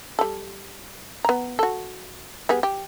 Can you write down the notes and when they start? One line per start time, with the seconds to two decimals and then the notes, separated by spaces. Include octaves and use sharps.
0.19 G3 A4
1.25 B3 A#5
1.59 F#4 A4
2.49 G3 B3 G#4
2.63 G4